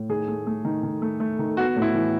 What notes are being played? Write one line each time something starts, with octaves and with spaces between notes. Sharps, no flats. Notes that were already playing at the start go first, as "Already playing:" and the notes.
Already playing: A2
D#3 G#4
A3
A3
D#3
D#3
A3
A3
D#3
B3 F#4
A2
E4
E3